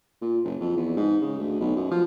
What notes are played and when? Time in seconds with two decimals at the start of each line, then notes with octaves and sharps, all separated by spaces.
0.22 A#2
0.44 F#1
0.60 F2
0.77 E2
0.97 G#2
1.22 C#3
1.39 D2
1.60 B1
1.76 F#2
1.91 F3